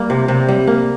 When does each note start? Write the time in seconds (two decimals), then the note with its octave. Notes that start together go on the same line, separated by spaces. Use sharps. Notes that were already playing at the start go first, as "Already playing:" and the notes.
Already playing: G3 A#3
0.10 C3
0.28 C3
0.49 G3
0.67 A#3